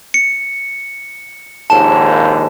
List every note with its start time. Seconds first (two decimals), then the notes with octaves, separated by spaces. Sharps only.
0.14 C#7
1.70 A#1 D#2 G#2 A5 E7